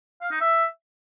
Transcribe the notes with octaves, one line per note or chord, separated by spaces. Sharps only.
F5
D#4
E5